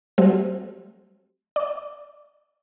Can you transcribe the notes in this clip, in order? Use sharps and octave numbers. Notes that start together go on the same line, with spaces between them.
F#3 G3 A3 C4
D5